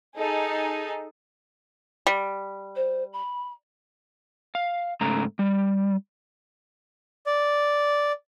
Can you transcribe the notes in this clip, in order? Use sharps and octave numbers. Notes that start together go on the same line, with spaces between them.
D#4 G#4 A4
G3
C5
B5
F5
G#2 C#3 A3 A#5
G3
D5